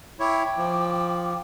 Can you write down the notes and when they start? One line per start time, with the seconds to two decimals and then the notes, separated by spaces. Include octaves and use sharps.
0.20 E4 C#5 G5 D6
0.58 F3